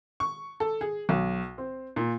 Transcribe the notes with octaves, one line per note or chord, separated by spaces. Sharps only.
C#6
A4
G#4
B1
C4
A#2